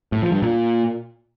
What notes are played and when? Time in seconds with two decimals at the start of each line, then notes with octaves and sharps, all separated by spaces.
0.12 A2
0.22 F3
0.32 G2
0.42 A#2